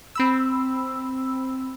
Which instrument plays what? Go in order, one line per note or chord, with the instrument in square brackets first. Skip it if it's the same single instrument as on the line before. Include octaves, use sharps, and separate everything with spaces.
[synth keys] C4 B5 E6